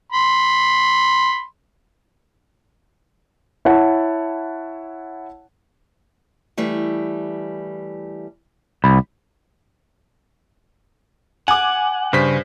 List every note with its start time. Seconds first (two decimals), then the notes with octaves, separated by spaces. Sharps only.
0.12 B5 C6
3.65 E4 C#5 F#5 A5
6.57 E3 G3 A3
8.84 C2 B5
11.48 F#5 G#5 D6
12.13 G2 C#3 C5 B6